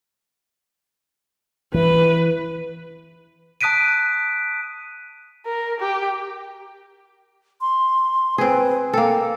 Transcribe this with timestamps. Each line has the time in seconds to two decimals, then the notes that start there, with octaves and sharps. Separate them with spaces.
1.74 E3 B4
3.61 A5 D#6 F#6 B6 D7 D#7
5.46 A#4
5.81 G4
7.61 C6
8.38 C4 G#4 B4
8.93 A#3 A4 G5